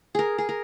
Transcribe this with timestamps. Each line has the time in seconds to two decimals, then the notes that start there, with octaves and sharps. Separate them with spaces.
0.15 G#4 A#4
0.38 G#4
0.49 A#4